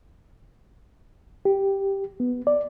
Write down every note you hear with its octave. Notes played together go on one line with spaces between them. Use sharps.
G4
B3
D5